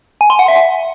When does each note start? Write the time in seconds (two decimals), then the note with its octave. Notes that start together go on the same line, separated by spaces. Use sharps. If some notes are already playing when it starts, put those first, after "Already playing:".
0.21 G#5
0.30 C6
0.39 F#5
0.48 E5